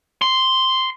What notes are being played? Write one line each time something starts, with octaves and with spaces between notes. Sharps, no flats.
C6